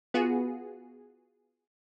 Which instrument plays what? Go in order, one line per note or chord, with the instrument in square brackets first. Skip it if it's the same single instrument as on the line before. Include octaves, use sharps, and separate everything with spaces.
[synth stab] B3 F4 F#4 G#4